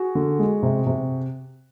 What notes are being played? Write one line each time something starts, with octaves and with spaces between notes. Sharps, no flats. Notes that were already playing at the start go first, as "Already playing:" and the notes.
Already playing: F#4 G#4
D3
G#3
C3
C3